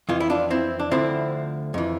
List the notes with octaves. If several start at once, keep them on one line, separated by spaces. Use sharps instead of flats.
F2 E3 F4
E4
D4 F4
C4 E4
D4
D2 D3 F3 C4 E4
F2 E3